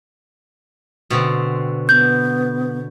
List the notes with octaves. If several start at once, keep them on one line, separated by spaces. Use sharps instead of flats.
B2 D3 C4
B3 G6